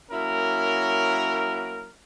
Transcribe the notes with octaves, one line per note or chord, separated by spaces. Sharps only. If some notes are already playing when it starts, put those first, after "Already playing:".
F#3 A#3 C#4 E4 A#4